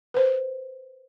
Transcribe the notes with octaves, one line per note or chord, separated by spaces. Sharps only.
B4 C5